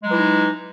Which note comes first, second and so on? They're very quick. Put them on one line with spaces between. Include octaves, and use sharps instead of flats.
G#3 F#3 E3 E4 D#4